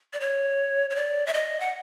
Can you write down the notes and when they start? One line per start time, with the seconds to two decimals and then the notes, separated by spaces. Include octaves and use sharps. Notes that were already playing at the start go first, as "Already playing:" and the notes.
0.13 D5
0.20 C#5
0.90 C#5
0.96 D5
1.26 E5
1.34 D#5
1.60 F#5